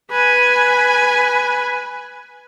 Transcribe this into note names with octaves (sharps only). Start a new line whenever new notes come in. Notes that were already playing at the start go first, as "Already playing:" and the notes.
B4 G#5